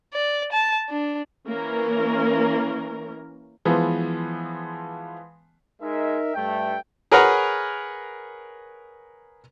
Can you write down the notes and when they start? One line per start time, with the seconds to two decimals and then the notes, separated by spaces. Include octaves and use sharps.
0.14 D5
0.52 A5
0.89 D4
1.47 E3 A#3 C#4 A#4
3.65 E3 F3 G#3 B3
5.82 G#3 D#4 A#4 E5
6.35 G2 A3 G5
7.12 G#4 A#4 B4 C#5 F#5 A#5